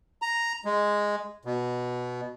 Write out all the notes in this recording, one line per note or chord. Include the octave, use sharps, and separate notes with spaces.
A#5
G#3
B2